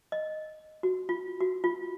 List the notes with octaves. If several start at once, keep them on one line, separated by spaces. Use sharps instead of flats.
D#5
F#4
F4
F#4
F4